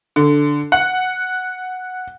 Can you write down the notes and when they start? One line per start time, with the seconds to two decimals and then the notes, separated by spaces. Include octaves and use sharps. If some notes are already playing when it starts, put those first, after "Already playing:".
0.16 D3
0.72 F#5